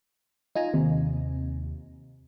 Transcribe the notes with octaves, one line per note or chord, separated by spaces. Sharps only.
D#4 F4 G#5 A#5
D#2 C3